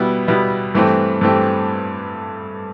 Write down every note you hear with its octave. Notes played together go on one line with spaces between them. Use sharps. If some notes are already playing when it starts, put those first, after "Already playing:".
Already playing: B2 G3 B3 E4
B2 G3 B3 E4
G2 E3 A3 C4 G4
G2 E3 A3 C4 G4